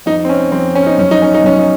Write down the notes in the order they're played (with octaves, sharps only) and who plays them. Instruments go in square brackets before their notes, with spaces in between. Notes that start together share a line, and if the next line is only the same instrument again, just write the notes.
[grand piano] F2 D#4
C4
C#4
F2 C4
C#4
D#4
F#2 C#4
D#4
C#4
D#4
F#2 C#4
D#4